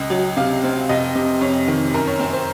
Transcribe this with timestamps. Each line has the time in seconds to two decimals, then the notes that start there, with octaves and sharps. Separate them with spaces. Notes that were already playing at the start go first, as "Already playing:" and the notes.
Already playing: C#2 D#5
0.10 F#3
0.37 C3 F5
0.64 C4
0.89 F1 D#5
1.15 C3
1.41 F2 C#5
1.68 D#3
1.94 F#2 A#4
2.07 C#5
2.19 C4 C5
2.33 C5